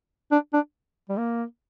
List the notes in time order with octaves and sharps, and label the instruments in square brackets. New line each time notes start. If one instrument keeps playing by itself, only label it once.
[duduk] D4
D4
G3
A#3